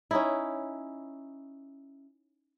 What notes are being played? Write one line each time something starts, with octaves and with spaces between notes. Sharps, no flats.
C#4 D#4 E4